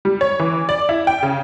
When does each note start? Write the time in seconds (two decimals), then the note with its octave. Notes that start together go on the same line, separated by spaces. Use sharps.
0.05 G3
0.21 C#5
0.39 E3
0.69 D5
0.89 E4
1.07 G5
1.23 C#3